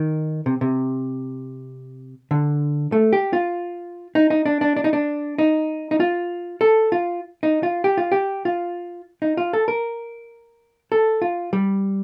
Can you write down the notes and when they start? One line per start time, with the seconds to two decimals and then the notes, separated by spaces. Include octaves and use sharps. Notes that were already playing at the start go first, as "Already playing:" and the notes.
Already playing: D#3
0.46 C3
0.61 C3
2.31 D3
2.92 A3
3.13 G4
3.33 F4
4.15 D#4
4.30 D#4
4.46 D4
4.61 D4
4.76 D4
4.84 D#4
4.93 D4
5.38 D#4
5.91 D#4
6.00 F4
6.61 A4
6.92 F4
7.43 D#4
7.63 F4
7.84 G4
7.97 F4
8.12 G4
8.45 F4
9.22 D#4
9.37 F4
9.53 A4
9.68 A#4
10.92 A4
11.22 F4
11.53 G3